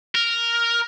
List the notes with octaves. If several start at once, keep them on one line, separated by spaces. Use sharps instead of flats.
A#4